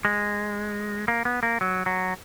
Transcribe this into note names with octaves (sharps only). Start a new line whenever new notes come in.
G#3
A#3
B3
A#3
F#3
F#3